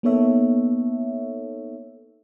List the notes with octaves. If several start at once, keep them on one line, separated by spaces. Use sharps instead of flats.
A#3 B3 D#4 A4 C#5 E5